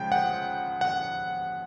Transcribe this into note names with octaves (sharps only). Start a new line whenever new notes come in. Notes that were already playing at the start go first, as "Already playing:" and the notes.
Already playing: C#3 F3 G#3 G5
F#5
F#5